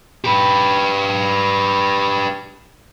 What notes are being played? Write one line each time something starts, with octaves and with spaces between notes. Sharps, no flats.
G4 B4